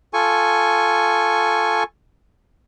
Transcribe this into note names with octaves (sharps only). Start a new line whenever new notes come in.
F4 A4 G#5 C#6